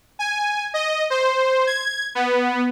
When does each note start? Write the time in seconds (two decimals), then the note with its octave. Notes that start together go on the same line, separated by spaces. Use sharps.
0.19 G#5
0.74 D#5
1.10 C5
1.67 G#6
2.15 B3